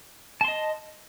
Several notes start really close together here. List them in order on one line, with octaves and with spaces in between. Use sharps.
A5 C6 D#5